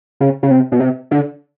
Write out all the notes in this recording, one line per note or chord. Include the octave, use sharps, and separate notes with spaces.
C#3
C#3
C3
B2
C3
D3